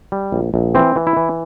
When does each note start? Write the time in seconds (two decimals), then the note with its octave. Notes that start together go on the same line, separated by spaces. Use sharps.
0.12 G3
0.32 A#1
0.54 A#1
0.75 E3 C4
0.96 E3
1.07 E4
1.17 E3